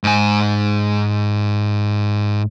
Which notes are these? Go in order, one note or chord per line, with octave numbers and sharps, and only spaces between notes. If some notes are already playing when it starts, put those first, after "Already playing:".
G#2 G#5